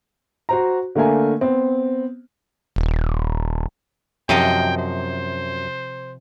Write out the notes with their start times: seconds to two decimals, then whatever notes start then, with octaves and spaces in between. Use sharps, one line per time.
0.49 F#4 C5 A#5
0.95 D3 A3 A#3 A#4 G#5
1.41 B3 C4
2.76 D#1
4.29 F#2 C3 F3 D#5 G5
4.77 C5